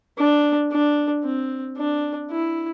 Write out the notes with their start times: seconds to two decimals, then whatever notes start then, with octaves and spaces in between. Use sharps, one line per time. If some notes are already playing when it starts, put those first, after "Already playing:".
0.18 D4
0.72 D4
1.24 C4
1.77 D4
2.30 E4